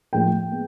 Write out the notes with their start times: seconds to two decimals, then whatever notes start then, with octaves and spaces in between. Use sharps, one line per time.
0.13 A2 F3 A3 G5
0.51 G#3 B3